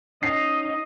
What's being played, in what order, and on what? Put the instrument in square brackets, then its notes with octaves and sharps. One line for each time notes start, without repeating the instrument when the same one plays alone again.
[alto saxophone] C#4 [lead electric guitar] D#4 [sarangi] D#5 [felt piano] C7